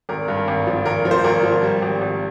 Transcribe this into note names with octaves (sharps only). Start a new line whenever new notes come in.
G#1 A#4
G2
G#1
F3
G#1 A#4
F3
C5
G#1 A#4
F3
G3
G#1
G#1